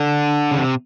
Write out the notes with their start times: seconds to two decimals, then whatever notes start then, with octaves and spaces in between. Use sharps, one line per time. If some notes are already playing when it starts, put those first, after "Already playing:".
Already playing: D3
0.51 C#3
0.58 C3